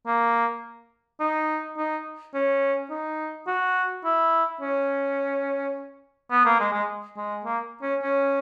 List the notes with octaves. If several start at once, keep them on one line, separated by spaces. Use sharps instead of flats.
A#3
D#4
D#4
C#4
D#4
F#4
E4
C#4
B3
A#3
G#3
G#3
G#3
A#3
C#4
C#4